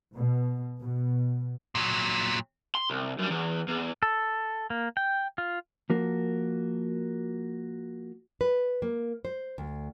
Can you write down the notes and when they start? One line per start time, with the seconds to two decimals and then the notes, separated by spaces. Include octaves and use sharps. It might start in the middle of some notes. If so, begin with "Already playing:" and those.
0.11 B2
0.82 B2
1.75 A#2 F#3
2.75 C6
2.90 C2
3.19 F#2 G3
3.31 E2
3.68 E2
4.03 A4
4.70 A#3
4.97 G5
5.38 F4
5.90 F3 A#3 F#4 A#4
8.41 B4
8.82 A#3
9.25 C5
9.58 D2